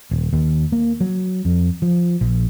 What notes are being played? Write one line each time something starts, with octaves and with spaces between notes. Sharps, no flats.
D#1
D#2
A#3
F#3
F2
F3
A#1